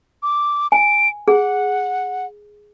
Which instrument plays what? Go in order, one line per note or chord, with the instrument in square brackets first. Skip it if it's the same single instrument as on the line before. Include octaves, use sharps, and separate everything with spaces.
[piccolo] D6
[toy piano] G#5 [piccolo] D7
[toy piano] G#4 [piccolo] F#5